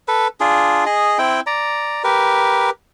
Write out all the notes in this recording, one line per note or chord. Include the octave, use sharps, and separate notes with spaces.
A4 B4
D4 F4 G#4
G#4 D#5
C4 E4 G5
D5 A#5
G4 A#4 B4